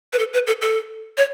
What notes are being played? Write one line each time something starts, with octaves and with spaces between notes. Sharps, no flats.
B4
A4
B4
A4
A4
C#5